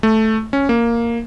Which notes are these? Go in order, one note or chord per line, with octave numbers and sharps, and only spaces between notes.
A3
C#4
A#3